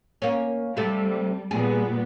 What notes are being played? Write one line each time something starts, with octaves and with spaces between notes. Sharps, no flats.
A#3 C#4
C3 G3 A3
A#2 G3 B3 G#4